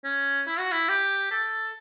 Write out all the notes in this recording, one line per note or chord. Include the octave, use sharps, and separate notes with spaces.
C#4
E4
F#4
E4
G4
A4